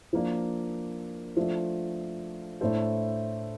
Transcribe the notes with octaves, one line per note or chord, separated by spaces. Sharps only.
F3 A#3 D4
F3 A3 D4 F4 A4
A2 A3 D4 A4 C5